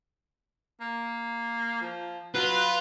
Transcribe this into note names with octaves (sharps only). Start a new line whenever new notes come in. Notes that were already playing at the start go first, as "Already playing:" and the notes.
A#3
F3
F#3 F4 B4